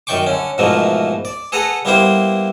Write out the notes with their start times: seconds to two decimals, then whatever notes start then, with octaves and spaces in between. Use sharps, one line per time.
0.07 F#2 D#3 D5 G5 C#6 D6
0.27 D3 C#4
0.58 G#2 B2 E3 F3 A3 A#3
1.25 D5
1.52 G#4 A4 B4 F#5 A#5
1.85 G3 A#3 B3 E4 G4 C5